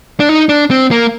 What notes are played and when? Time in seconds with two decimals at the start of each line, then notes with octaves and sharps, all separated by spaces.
0.20 D4
0.29 D#4
0.49 D4
0.71 C4
0.91 A#3